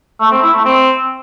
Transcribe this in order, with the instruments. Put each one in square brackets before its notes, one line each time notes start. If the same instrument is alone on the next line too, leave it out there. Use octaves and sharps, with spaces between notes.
[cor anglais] A3
C4
E4
A3
C4